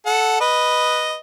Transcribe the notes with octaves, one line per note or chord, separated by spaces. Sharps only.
A4 F#5
B4 D#5